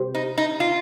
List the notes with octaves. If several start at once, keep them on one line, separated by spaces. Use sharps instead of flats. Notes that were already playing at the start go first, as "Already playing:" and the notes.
Already playing: C3 G3 C4 G4 C5
D#4
D#4
F4